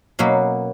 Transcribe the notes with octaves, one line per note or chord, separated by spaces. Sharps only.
B2 F#3 A#3 C#4